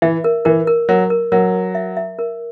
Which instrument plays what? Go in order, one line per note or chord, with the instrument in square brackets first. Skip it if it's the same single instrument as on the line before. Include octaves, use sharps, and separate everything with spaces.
[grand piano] E3 [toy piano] E5
[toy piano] A#4
[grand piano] E3 [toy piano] A#4
[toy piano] A#4
[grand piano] F#3 [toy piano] A#4
[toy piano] A#4
[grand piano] F#3 [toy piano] A#4
[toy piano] A#4
E5
E5
A#4